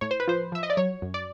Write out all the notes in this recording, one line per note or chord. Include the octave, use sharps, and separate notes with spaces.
A2 C#5
C5
B4
F3 C5
F3 E5
D#5
D5
F#3 C#5
F#2
D5